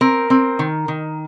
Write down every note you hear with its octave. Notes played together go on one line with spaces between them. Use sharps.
C4 A#4
C4
D#3
D#3